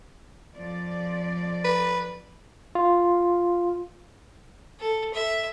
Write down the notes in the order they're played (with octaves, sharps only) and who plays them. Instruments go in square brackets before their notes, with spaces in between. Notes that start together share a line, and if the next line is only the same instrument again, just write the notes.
[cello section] F2 F3 D5
[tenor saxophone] B4
[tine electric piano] F4
[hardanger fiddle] A4
E5